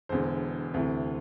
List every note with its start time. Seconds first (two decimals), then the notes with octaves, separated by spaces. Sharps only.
0.09 E1 E2 D3 C5
0.74 D2 C3 E3